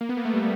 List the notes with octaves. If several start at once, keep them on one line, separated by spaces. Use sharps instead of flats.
A#3
B3
A#3
A3
G3